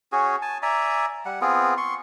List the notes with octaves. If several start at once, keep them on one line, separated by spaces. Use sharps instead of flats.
C#4 F#4 G#4
G#5 A5
D5 E5 G#5 A#5
G3 F#5
B3 C4 F4 G#4
C6 C#6